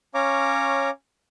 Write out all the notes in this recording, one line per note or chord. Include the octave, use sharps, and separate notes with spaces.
C#4 C#5 F5 A#5 D6